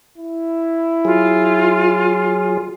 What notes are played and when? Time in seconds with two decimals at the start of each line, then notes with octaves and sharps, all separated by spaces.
0.18 E4
1.05 F#3 F4 G#4